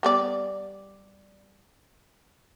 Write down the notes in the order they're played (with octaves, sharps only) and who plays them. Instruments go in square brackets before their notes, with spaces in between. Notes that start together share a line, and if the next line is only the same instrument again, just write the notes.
[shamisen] G3 B3 D5